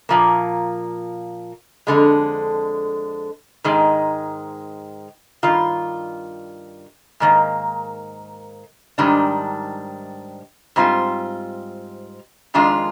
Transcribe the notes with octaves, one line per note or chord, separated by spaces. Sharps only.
A#2 F3 A#3
F2 D3 G#3
G#2 D#3 G#3
G2 D#3 F4
G#2 D#3 A#3
G#2 D#3 G3 D4
G#2 G3 C4 F4
F2 D#3 G#3 D4 F4